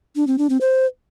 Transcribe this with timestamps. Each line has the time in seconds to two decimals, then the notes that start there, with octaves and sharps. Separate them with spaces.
0.16 D4
0.27 C4
0.38 D4
0.50 C4
0.61 C5